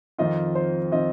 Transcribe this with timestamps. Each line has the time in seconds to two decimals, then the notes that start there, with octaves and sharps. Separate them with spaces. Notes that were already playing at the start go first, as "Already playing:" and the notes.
0.18 F2 D#3 C4 F4 D#5
0.55 C5
0.92 D#3 C4 F4 D#5